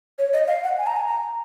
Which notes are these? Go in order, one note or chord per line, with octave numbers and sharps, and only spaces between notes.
C#5
D#5
F5
F#5
G#5
A#5
G#5
A#5